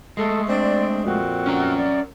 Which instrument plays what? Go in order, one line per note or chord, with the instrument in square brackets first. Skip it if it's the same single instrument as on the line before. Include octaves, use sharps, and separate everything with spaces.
[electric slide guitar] G#3 A3 [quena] A4
[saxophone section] C4 D4 [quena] D5
[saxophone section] F2 A#2 C4 [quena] F#4
[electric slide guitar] C#4 A#4
[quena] D5